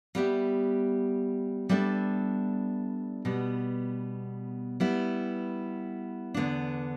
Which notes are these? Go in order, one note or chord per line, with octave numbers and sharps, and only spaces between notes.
G3 B3 G4 E5
G3 B3 D4 A4 E5
B2 G3 B3
G3 B3 E4
E2 D3 B3 D4